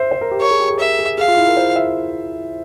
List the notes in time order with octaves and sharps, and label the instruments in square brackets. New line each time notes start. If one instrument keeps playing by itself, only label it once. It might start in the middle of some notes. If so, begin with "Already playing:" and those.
Already playing: [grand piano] C5 E5
C5
A#4
G4
[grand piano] A#4 [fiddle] C#5
[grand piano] G#4
G4
G#4
[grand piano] A#4 [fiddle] E5
[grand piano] G#4
[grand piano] G#4 [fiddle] F5
[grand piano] F4
E4
A#4
C5
E5